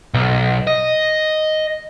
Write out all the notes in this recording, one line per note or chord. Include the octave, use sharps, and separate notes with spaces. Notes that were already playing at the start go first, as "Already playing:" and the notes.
B1
D#5